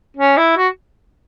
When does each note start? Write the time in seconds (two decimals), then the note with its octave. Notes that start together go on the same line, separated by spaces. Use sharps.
0.17 C#4
0.37 E4
0.57 F#4